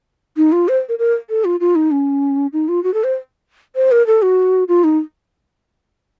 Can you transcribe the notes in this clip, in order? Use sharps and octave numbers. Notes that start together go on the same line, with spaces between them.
D#4
F4
C5
A#4
A#4
A4
F4
F4
D#4
C#4
D#4
F4
F#4
A4
C5
C5
A#4
A4
F#4
F4
D#4